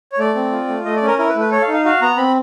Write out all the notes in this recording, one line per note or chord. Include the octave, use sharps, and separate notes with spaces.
C#5
A3 D5
C4
F4
A3
A3 D#5
D5
C#4
A#4
E4 A#4
B4
A3
B4
A4 C#5
F5
D#4
F5
F#4 F5
B3 A#5
C4 B5